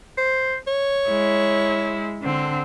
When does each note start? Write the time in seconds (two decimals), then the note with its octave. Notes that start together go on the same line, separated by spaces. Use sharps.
0.17 C5
0.67 C#5
1.09 G#3 E4
2.22 D3 C4